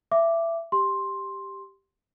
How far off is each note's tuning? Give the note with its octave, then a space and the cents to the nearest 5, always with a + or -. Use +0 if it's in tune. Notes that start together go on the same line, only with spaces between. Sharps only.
E5 +20 D6 +0
G4 +0 C6 +10